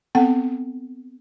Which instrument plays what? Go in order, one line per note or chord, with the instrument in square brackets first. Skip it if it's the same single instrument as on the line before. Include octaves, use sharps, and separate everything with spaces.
[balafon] B3 C4 A4 F#5 G5